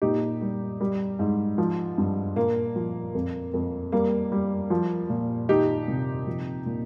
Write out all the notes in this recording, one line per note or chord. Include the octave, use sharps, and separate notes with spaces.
A#2 D#4 G4
G3
G3
G#2
F3
G2
A#2 A#3
F3
F2
F2
G3 A#3
G3
F3
A#2
D#3 D#4 G4
C3
F3
A#2